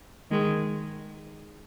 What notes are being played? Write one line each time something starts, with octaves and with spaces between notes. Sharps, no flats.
D#3 G#3